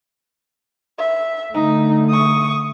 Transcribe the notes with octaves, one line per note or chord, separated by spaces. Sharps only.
E5
D3 A3 D#4
C#6 D#6